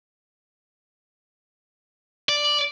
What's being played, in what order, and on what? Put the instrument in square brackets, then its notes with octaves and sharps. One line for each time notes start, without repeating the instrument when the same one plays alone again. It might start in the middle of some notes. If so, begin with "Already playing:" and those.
[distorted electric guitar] D5